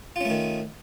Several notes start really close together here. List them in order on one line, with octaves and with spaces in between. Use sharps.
F4 C#4 A3 D#3